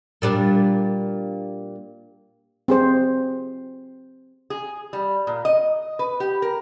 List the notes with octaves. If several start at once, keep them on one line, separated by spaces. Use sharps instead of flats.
A#2 G3 D4
C4 G#4 C5
G#4
G3
A#2
D#5
B4
G4
A#4